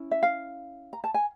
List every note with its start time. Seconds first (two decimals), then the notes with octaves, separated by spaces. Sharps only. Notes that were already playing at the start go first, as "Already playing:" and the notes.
Already playing: C#4 E4
0.11 E5
0.23 F5
0.93 A#5
1.04 A5
1.14 G#5